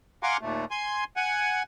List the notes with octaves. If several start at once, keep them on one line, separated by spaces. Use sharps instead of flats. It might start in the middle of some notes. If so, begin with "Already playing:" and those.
F5 F#5 G#5 A#5 C6 D6
D#2 A#2 A3
G#5 C6
F#5 G#5